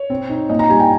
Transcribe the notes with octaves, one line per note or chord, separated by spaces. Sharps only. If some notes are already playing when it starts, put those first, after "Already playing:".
Already playing: C#5
C4
D#4
A#2 D#5
A#5
G3 G#5
G5